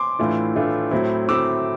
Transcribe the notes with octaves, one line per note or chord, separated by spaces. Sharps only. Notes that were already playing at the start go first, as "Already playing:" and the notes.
Already playing: C6 D6
A2 E3 A3 D4 F4
A2 E3 A3 D4 F4
A2 F#3 A3 C4 E4
A2 F#3 A3 C4 E4 D6 E6